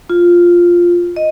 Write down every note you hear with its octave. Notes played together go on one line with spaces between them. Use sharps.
F4
D#5